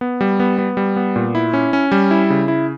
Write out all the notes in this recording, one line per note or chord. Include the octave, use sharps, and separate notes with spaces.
B3
G3
B3
B3
G3
B3
A#2
E4
C#4
C#4
G3
E4
C#3
E4